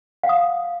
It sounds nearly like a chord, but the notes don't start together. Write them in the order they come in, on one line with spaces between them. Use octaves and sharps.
F5 F#5 D#6